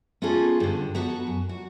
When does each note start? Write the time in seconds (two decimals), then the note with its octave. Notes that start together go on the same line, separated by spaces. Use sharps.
0.22 B3 C#4 F4 G#4 A4
0.60 G2 D3
0.95 B3 F#4 G4 A4
1.27 F#2
1.49 F#4